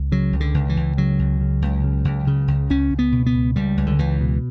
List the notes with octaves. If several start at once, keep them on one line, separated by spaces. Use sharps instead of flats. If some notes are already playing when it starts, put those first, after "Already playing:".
Already playing: C#2
C#3 F#3
C#2
D3
C#2
E3
C#2
C#3 F#3
C#2
C#3
C#2
C#3
C#2
C#3
C#2
C#2 C#4
C#2
B3
B2
B3
C#2
C#2 G3
C#2
D3
C#2 E3
B2